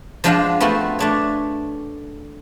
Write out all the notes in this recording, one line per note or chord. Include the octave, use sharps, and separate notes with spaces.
F3 G#3 D4 F4 F5 F#5
A3 B3 C4 F4 F#4
A3 D4 C#5